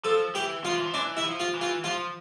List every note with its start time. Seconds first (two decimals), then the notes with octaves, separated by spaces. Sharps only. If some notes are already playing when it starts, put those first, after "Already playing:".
0.04 F3 A4
0.35 E3 G4
0.64 F3 F4
0.74 E3
0.83 F3
0.94 E3 D4
1.17 E4
1.25 F3
1.40 F4
1.55 E3
1.61 F4
1.84 F3 F4